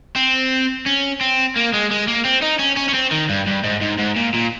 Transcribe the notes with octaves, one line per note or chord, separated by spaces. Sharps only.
C4
C#4
C4
A#3
G#3
G#3
A#3
C4
D#4
C#4
C#4
C#4
C4
D#3
G2
G2
G#2
G#2
G#2
A#2
A#2